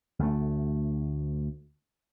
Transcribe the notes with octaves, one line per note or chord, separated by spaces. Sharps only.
D2 A3